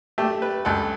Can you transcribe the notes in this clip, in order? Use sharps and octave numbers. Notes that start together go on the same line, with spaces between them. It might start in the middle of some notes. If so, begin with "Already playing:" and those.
A3 G4
B4
C#2 A4